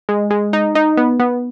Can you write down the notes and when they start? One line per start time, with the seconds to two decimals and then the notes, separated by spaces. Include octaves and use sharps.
0.09 G#3
0.31 G#3
0.53 D#4
0.75 D#4
0.97 B3
1.20 B3